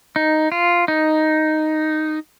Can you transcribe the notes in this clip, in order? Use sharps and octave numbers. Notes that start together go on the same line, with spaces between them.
D#4
F4
D#4